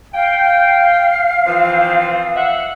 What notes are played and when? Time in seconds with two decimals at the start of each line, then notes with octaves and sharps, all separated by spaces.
0.14 F5 G5
1.47 E3 F3 C4
2.35 E5 F#5